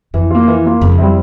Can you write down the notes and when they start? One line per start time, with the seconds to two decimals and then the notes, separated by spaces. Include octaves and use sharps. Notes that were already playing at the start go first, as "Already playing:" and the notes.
0.14 F2 E3
0.31 A#3 F4
0.48 E3
0.65 A#3 F4
0.81 F2 C#3
0.98 G3 C4 E4